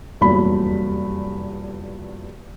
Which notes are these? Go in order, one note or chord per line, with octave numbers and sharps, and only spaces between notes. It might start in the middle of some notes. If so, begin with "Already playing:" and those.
F1 E2 G2 A#2 F#3 B5